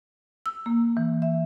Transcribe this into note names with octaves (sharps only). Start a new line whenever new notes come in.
E6
A#3
E3
E5